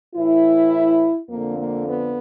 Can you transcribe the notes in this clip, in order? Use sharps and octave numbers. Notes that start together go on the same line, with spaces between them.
A2 E3 E4
F2 D3 A#3
A#3
B3